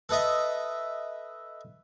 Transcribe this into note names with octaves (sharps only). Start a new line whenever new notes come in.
A4 B4 D#5 E5